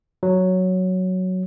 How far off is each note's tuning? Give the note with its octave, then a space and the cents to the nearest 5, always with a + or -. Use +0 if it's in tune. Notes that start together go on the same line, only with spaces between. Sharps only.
F#3 +0